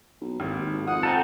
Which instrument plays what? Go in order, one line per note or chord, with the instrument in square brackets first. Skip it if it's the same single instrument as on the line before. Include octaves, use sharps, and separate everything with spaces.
[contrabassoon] B1
[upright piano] G#1 [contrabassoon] D#2
[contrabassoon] G#1
[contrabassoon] F2 [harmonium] F#5 [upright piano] D#6
[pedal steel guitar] C4 D#4 A4 [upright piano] G#5